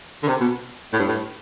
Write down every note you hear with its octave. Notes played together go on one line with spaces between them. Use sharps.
D3
C3
B2
A2
G2
A2